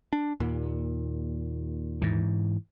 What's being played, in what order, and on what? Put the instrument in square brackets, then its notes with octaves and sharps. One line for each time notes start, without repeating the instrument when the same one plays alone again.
[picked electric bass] D4
D#2 A#2
[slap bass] G#2 E3